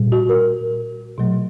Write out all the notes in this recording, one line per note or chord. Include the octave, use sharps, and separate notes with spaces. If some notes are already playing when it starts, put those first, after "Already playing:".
Already playing: A#2 G3
F#4
A#4
B2 F#3 A3